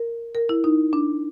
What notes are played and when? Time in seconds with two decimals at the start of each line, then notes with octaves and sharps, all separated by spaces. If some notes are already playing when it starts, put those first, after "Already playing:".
Already playing: A#4
0.35 A#4
0.49 E4
0.64 D#4
0.93 D4